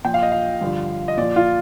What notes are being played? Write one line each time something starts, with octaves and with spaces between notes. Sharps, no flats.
A#2 F3 G5
F5
D#5
F5
G2 D3 F3
D#5
A#2 F3 D5
F4